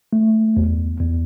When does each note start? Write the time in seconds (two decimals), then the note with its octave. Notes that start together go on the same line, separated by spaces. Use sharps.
0.13 A3
0.57 E2
1.00 E2